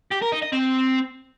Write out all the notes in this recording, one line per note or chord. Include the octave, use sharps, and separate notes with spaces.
G4
A#4
D#4
D#5
C4